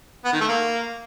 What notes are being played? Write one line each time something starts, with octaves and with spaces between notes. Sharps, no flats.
B3
D#3
A3
A#3